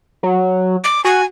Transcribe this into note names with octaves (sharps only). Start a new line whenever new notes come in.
F#3
D6
F#4 G#5